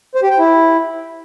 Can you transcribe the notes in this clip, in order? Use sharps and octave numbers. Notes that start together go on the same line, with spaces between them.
C5
G4
G5
E4